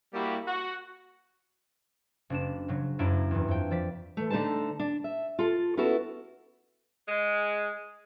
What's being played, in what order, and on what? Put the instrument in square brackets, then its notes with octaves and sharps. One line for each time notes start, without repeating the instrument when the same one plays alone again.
[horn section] G3 A#3 E4 F#4 G4
F#4
[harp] F#1 D4 E7
G#2 C#3 F#3
F#1 F#2 D4 E4 A#5 D7
E2 G2
F2 G5
F3 D5 B6
[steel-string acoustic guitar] E3 A3
D3 A3 D#4 C5 A5
D4
E5
F4 A4
B3 C#4 E4 F#4 A4
[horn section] G#3